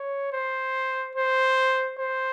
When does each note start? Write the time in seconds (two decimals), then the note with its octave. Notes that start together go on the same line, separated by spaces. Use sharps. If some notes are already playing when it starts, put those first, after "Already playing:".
Already playing: C#5
0.33 C5
1.16 C5
1.99 C5